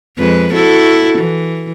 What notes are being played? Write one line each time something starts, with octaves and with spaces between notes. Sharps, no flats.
F2 G#3 B4
E4 F#4 A4
E3